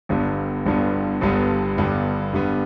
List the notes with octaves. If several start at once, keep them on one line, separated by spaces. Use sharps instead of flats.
G1 G2 D3 G3 B3
G1 G2 D3 G3 B3
G1 G2 D3 G3 B3
G1 G2 D3 G3 B3
G2 D3 G3 B3